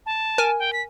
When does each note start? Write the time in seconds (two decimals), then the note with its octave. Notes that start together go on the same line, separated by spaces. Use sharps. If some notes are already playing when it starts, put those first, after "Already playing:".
0.06 A5
0.38 A#4 G#5
0.59 G5
0.73 B6